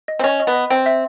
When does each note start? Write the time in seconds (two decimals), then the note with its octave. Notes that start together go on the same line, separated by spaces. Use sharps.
0.08 D#5
0.19 C4
0.24 C#4 D#5
0.40 D#5
0.47 B3
0.55 D#5
0.70 C4 G5
0.86 E5